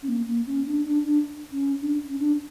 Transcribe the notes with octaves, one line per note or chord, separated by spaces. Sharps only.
C#4
A#3
A#3
C#4
D4
D4
D4
C#4
D4
C#4
D4